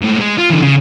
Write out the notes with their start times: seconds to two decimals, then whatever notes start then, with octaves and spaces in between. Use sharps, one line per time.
0.01 G#2 A3
0.20 G#3
0.38 F4
0.50 D3 E3
0.63 C#3